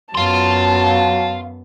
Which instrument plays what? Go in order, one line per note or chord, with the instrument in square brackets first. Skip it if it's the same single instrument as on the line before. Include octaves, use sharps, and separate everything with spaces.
[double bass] F#2 B3 [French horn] F#3 [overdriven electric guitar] F5 C6 [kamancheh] A5